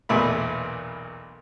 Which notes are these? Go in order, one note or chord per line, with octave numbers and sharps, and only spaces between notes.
B1 E2 A#2 A3 B5